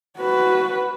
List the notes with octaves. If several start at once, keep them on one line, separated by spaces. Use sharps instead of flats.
F#4 B4